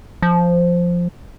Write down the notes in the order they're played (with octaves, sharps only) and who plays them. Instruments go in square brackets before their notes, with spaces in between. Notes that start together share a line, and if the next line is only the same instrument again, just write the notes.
[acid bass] F3